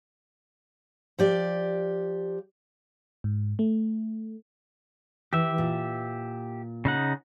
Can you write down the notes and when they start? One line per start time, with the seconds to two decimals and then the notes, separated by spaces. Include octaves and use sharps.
1.19 F3 G4 D5
3.24 G#2
3.59 A3
5.33 E3 G4 E5
5.58 A#2
6.85 C#3 D#4 F#5